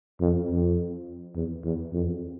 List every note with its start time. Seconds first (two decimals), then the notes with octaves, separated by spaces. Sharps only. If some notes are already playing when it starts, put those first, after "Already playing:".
0.21 F2
0.50 F2
1.36 E2
1.64 E2
1.93 F2